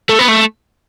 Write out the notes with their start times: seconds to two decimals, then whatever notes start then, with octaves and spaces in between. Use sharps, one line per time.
0.09 A3
0.19 B3
0.28 A3